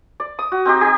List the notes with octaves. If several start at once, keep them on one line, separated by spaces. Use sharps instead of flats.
D5
D#6
F#4
C4 D#4 G4
D#4 G4